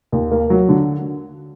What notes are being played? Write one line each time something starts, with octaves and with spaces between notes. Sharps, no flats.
D#2
A#3
F#3
D3